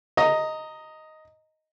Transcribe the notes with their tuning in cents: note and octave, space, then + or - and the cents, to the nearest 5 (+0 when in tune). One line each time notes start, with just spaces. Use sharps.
D#5 +5 A#5 -15